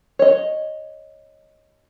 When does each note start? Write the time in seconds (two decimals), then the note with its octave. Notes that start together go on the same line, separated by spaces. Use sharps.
0.19 C#5 D#5